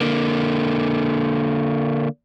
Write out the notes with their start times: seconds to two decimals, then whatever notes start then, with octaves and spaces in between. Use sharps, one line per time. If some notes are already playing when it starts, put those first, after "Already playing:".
0.01 D3 A#3